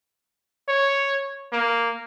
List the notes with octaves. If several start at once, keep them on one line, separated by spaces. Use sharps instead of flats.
C#5
A#3